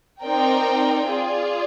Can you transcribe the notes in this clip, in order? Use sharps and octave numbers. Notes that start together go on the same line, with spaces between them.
C4 D#4 A#4 D5 G5
F4 G#4 D5